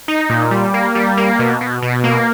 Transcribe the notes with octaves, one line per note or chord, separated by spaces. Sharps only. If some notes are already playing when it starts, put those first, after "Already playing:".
D#4
A#2
G3
A#3
G3
A#3
B2
B2
B2
A#3